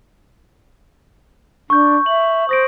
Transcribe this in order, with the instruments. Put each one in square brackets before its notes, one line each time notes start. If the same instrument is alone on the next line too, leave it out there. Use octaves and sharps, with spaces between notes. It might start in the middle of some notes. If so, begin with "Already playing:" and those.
[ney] D4 [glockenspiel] C#6 G6
[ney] E5 [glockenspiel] F#7
[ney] C5 [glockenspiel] D#6 A#6 D7